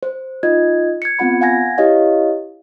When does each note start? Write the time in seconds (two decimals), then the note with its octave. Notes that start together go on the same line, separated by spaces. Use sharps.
0.03 C5
0.43 D#4 F4 D#5 G#6
1.02 G#6 C#7
1.19 B3 C4 F4 F#5 B5
1.41 F5 F#5 G#5 G#6 A#6
1.78 E4 G4 C#5 D#5 F5